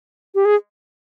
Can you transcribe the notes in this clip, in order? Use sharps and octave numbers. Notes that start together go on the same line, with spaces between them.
G4
G#4